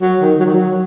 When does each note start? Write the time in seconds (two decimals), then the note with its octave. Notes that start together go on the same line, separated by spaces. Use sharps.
0.02 F#3
0.21 D#3
0.40 F#3
0.45 D#3
0.54 F#3